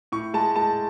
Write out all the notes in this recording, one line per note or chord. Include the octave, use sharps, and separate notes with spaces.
A2 C#6
G#3 A5
G#3 A5